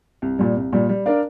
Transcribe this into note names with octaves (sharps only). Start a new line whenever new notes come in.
C2
A#2 G3
C2
A#2 G3
G3
D4 A#4 D5 F5